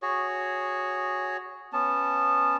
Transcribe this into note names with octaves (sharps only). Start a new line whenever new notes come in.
F#4 G#4 C#5
B3 C#4 A5